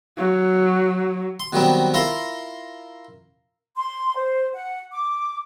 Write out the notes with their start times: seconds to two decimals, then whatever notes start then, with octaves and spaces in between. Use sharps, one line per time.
0.18 F#3
1.40 C6
1.53 B2 D#3 F#3 G3 B3 C4
1.94 E4 F4 A#4 F5 A#5 C6
3.76 C6
4.16 C5
4.53 F#5
4.91 D6